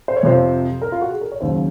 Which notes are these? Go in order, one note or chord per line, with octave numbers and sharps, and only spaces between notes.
C5
C#5
F2 C3 F3 C5
A#4
F4
F#4
G#4
A#4
C#5
D#2 C#3 F#3 C5